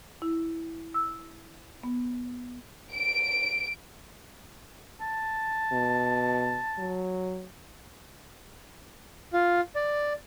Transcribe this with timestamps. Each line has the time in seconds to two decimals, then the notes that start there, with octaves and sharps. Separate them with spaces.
0.22 E4
0.94 E6
1.83 B3
2.93 D7
5.01 A5
5.72 B2
6.79 F#3
9.33 F4
9.76 D5